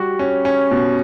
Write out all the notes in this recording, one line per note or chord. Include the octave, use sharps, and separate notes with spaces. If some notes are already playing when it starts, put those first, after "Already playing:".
Already playing: G3 F#4
C#4
C#4
B2